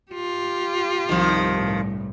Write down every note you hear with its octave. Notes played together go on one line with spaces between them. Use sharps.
F4 G4
C2 G2 D#3 F3
A2